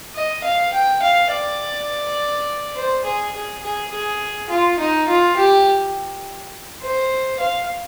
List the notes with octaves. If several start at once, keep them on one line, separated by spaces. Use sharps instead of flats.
D#5
F5
G5
F5
D5
C5
G#4
G#4
G#4
G#4
F4
D#4
F4
G4
C5
F5